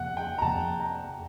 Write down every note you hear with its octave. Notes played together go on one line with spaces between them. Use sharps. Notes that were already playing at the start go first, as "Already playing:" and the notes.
Already playing: F2 C3 F3 A#3 F#5
G5
A#5
F2 C3 F3 A#3 A5
A#5